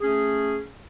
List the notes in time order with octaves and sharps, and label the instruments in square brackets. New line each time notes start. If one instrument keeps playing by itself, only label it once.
[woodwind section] A3 C#4 G#4